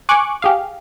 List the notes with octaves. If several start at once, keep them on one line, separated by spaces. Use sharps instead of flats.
G#5 C#6 D6 F#6
G4 G#4 F5